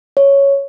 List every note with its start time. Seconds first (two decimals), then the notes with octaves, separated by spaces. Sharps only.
0.17 C#5